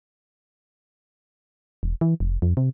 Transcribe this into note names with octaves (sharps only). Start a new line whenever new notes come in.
E1
E3
F1
F2
C3